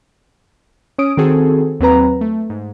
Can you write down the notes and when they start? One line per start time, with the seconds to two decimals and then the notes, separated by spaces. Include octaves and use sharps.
0.98 C#4 C#5 D#6 D7
1.17 D#3 C4 F#4 G#4 A4
1.80 D#2 F#3 C4 B4 A#5
2.21 A3
2.50 G#2